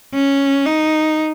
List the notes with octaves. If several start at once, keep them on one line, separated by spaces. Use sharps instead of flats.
C#4
D#4